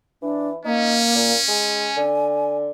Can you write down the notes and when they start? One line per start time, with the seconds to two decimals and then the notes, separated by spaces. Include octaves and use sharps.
0.22 E3 D4
0.65 A#3 C#4 D#4
1.15 A#2
1.48 G#3 G#5
1.97 D3